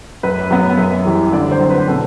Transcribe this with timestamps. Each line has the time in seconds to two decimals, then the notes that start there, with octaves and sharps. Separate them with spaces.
0.23 F#2 B4
0.51 F#3 B3
0.78 F#2
1.05 E3 G3
1.33 D3 D5
1.51 C5
1.60 F#3 C4
1.70 B4
1.88 B2 A4